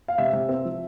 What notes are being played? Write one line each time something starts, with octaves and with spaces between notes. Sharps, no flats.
F5
C3 E5
C3
C4
F3